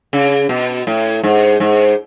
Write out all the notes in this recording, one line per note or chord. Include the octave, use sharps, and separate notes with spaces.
C#3
B2
A2
G#2
G#2